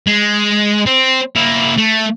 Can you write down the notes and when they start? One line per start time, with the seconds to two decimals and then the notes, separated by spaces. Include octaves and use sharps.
0.07 G#3
0.86 C4
1.36 A#3 E4
1.78 A3